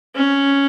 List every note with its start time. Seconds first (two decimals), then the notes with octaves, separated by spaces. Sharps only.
0.15 C#4